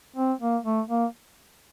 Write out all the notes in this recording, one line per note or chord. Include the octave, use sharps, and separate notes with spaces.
C4
A#3
A3
A#3